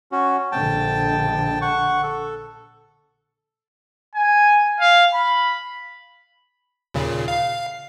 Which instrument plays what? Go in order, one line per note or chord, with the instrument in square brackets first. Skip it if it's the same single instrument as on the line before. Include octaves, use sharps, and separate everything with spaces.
[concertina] C#4 F#4
[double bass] A#1 D3 [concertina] G5 A5
[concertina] F#5 C#6
A4
[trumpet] G#5
F5
B5
[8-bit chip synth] D#2 A#2 C#3
F5